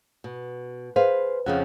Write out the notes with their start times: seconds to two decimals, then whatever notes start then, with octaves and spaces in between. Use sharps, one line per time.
0.24 B2
0.96 G#4 B4 C5 F5
1.46 F2 C#3 F3 F#5